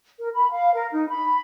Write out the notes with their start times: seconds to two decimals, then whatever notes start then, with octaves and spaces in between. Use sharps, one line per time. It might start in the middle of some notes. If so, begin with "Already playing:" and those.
0.19 A#4
0.33 B5
0.51 F5
0.73 A#4
0.91 D#4
1.09 B5